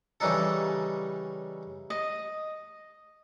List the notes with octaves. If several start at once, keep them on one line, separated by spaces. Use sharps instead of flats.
C#3 E3 G3 D4 D#4 A4
D#5